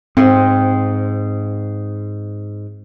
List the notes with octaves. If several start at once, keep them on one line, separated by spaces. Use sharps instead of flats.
G#2 C4